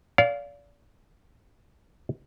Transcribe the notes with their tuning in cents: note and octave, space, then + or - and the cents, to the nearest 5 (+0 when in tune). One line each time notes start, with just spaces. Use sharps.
D5 -35 F5 +0